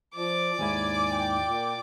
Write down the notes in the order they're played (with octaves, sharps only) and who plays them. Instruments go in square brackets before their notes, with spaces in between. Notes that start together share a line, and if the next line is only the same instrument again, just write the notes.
[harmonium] F3 [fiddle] D5 D6
[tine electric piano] D#2 G#2 E4 [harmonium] G#5
[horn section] G5
[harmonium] A#2